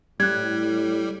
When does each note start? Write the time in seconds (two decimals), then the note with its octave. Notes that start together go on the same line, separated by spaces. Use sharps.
0.20 A2 G3 F#6 G#6